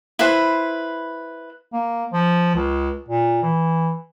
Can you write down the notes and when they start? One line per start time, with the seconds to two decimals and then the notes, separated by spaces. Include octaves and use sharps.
0.19 E4 B4 C5
1.73 A#3
2.13 F3
2.55 C#2
3.09 A#2
3.43 E3